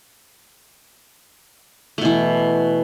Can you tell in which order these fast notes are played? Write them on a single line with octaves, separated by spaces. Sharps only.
A3 B2 E3